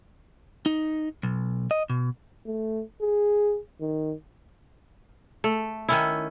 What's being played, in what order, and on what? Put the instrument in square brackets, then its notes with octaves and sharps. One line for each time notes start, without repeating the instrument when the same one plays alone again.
[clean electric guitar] D#4
B1
D#5
B2
[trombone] A3
G#4
D#3
[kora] A3
D#3 C#4 E4